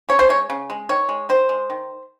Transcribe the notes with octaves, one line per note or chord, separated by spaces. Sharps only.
C#3 C#5
C5
G#3 C#5
C#3
G#3
D#3 C#5
G#3
D#3 C5
G#3
D#3